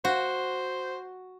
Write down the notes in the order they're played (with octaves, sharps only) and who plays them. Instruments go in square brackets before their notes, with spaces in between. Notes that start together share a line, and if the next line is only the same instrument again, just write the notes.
[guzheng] F#4 [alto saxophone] C5